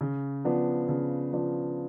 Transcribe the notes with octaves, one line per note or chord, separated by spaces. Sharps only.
C#3
F3 B3 D4
C#3
F3 B3 D4